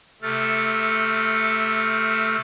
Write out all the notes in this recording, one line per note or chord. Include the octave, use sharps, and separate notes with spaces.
C3 A3 A4 F6 A6